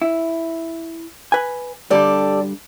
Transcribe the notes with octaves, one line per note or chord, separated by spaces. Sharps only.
E4
B4 G#5
G2 D3 G3 G4 A4 D5